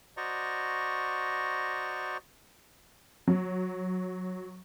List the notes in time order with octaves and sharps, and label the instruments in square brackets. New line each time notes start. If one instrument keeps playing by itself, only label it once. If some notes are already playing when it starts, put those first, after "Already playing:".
[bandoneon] F#4 C5 D5 D#5 A#5 C#6
[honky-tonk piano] F#3